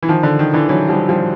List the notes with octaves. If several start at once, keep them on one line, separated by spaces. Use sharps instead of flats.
E3
D#3 F3
D3
D#3
D3 E3
E3 F#3
F3 G3
F3 G3